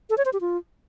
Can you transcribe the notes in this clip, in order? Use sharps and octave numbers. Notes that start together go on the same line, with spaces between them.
A4
C#5
C5
G4
F4